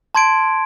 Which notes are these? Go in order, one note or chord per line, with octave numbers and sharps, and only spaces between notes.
A5 C6 G#6 D7